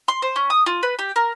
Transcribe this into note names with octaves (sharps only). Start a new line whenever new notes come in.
C6
C5
C#4
D#6
F4
B4
G4
A#4